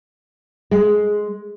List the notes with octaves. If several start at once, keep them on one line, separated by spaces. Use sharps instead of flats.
G#3